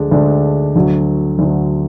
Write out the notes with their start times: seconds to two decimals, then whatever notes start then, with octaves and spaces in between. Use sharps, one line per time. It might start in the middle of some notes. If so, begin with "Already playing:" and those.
Already playing: D2 D3 G#3 D4
0.11 D2 D3 G#3 D4
0.75 D2 D3 F#3
1.39 D2 D3 F#3